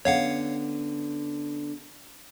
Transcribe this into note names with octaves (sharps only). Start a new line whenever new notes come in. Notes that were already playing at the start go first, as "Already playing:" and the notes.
D3 B3 C#4 C#5 F5 F#5